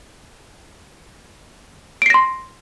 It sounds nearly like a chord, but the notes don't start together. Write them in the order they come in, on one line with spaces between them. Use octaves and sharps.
D7 C7 A#6 C6